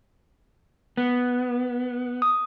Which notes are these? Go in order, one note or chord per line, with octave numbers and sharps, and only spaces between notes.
B3
D#6